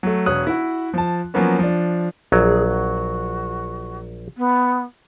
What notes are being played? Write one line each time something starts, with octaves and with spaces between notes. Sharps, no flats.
F#3 A3
E1 C#5 D#6 F#6
E4 F#4
F3 A5
F3 F#3 A#3 B3 C#4
F3 D4
A#1 F#3 G#4
F#4
B3